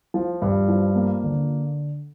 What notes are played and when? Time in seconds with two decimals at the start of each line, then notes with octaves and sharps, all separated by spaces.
0.14 F3
0.42 G2
0.68 F3
0.95 A#3
1.24 D3